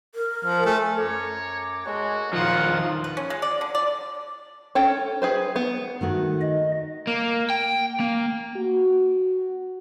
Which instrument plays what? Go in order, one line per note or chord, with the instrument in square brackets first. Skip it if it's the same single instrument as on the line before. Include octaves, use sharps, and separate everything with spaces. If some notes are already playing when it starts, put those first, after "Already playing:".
[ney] A#4
[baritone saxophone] F3
[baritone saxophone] A3 [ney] G#5
[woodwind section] F#2 A#5 D6 [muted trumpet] C#5
[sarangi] G#3 [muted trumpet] F#4 [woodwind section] A4 A#4 C#5
[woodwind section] E2 A#2 [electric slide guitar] D#3 F3 [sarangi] F4 [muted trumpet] F#5
[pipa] B4
C#4
G#3
D5
D3
D5
[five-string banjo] C#4 A4 G5
G#4 B4 C5
B3
[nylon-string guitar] D#3 A3 F#4
[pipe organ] D#5
[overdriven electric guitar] A#3
G5
A#3
[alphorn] F#4